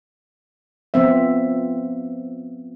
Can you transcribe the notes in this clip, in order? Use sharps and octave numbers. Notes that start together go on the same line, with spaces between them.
F3 B3 C4 E5